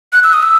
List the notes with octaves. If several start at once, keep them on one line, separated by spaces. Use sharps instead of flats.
F#6
E6
D#6
E6